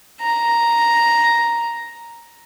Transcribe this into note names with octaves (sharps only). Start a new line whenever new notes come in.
A#5